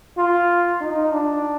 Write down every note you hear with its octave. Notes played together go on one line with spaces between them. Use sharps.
F4
D#4
D4